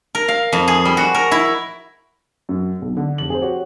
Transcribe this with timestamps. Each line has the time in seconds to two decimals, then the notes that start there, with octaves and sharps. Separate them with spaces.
0.15 A#4
0.28 F5
0.53 F2
0.68 G#4
0.85 G3
0.97 F#4
1.15 A#4
1.32 E4
2.49 F#2
2.82 B1
2.97 D3
3.18 F1 F#7
3.30 G#4 C5
3.41 F#4 G4 C#5